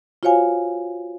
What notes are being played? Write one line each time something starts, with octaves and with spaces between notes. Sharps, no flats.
F4 F#4 C5 C#5 F5 G#5